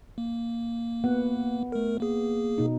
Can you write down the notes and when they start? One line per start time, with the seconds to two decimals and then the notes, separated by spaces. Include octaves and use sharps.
0.18 A#3
1.04 B3 F#5
1.72 A3 A#4
2.00 A#3 G#4
2.58 B2 D#4